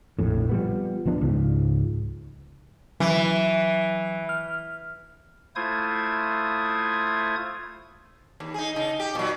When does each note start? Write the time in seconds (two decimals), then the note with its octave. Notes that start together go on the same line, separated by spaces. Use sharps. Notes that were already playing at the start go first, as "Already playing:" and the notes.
0.19 A#1 F2 A2
0.49 F3 G3 B3
1.06 D1 F3 B3 D4
1.21 C#2 G#2 F3
3.00 E3 F#3
4.29 F6
5.56 A3 E4 F4 C5 D#6 G#6
8.40 D#2
8.54 D#4 G#4
8.76 C#3 D#4
8.99 G4
9.15 A#2 F#3